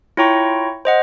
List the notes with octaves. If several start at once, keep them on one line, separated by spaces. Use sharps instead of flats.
E4 F4 C#5 G5 A#5 C#6
C5 D#5 F#5